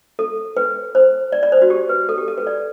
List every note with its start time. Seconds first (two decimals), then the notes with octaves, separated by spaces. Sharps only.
0.19 A4
0.57 B4
0.95 C5
1.32 D5
1.43 D5
1.52 C5
1.62 F#4
1.70 G4
1.89 B4
2.09 A4
2.18 G4
2.28 A4
2.38 B4
2.47 D5